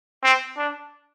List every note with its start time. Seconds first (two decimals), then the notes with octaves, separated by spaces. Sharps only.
0.23 C4
0.57 D4